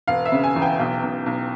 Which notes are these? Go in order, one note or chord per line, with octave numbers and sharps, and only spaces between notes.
E1 F5
E5
C#3
G#5
E2
G5
B1
B1
B1